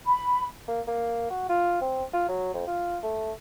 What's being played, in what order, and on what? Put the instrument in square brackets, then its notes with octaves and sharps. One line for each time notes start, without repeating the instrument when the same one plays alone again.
[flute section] B5
[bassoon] A#3
A#3
F#4
F4
C4
F4
F#3
F2
F4
A3